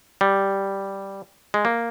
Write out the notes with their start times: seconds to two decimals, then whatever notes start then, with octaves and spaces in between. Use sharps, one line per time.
0.21 G3
1.54 G#3
1.65 A#3